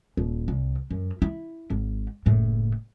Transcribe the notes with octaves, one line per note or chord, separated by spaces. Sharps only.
D#1
C2
F#2
E4
G#1
F#1 A2